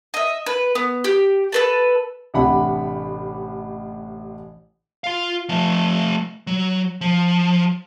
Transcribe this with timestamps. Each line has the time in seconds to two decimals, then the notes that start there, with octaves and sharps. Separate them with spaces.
0.14 D#5 E5
0.46 B4
0.75 B3
1.04 G4
1.52 A4 B4 A5
2.34 A1 C3 D4 F#5 G5 B5
5.04 F4 F5
5.49 F3 A3
6.47 F#3
7.01 F3